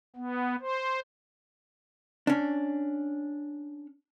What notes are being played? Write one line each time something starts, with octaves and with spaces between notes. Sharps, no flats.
B3
C5
C#4 D4